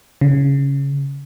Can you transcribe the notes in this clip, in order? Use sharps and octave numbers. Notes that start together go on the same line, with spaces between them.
C#3